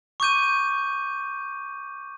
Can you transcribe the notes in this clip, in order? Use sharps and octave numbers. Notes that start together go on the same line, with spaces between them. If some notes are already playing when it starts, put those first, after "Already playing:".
C#6 D6 G6 D#7